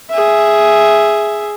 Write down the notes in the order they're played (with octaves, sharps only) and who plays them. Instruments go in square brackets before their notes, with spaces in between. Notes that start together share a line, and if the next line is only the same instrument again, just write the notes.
[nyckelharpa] G#4 E5